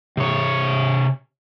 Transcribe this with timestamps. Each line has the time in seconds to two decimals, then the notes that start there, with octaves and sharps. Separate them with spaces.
0.17 C3 C#5